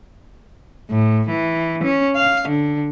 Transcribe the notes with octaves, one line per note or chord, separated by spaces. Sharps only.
A2
E3
C#4
F5
D3